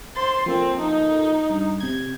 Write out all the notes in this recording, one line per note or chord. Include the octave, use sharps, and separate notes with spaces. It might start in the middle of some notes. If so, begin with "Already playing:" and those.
C5 C6 A6
F3 A#3 C4 A4
D#4
G2
C3 G6 G#6